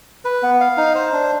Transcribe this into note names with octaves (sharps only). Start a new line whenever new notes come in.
B4
B3
F5
D#4
C5
D4